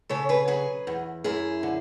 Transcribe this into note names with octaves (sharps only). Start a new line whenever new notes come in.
C#3 A4 C#5
G#4 B4
F#3 G#4 B4
E2
F#2 E4 G#4
D3